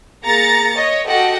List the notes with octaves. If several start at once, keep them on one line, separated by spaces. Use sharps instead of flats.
A#3 G#4 A#5 A6 C#7
C#5 D#5
F#4 G4 A4 D#5 F#5 G5